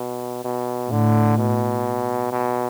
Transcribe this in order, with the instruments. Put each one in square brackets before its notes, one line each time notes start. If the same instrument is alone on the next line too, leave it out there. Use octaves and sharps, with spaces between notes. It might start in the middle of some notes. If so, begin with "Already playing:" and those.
Already playing: [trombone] B2
B2
[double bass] A2 [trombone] D3
[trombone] B2
B2